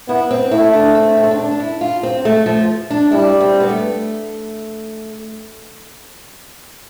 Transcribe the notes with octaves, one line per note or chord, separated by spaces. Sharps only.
B3 E4
C4
A3 E4
D4
C4
C4
D4
C4
D4
D4
E4
F4
C4
A3
F3
D4
G3 E4
C4
B3
A3